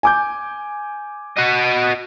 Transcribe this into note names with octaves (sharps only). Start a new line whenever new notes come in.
G#5 D6 G6
F#4 D#5